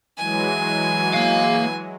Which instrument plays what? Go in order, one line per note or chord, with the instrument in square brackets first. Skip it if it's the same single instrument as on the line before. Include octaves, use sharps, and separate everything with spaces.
[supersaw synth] E3 F#3 G#3 [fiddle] G#5
[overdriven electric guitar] A#3 F5